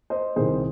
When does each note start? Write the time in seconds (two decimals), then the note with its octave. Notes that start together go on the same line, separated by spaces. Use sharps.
0.10 C5 D#5
0.36 C2 C3 D#3 G#4 C5